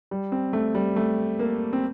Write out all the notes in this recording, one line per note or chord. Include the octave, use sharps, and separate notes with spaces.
G3
C4
A3
G3
A3
A#3
C4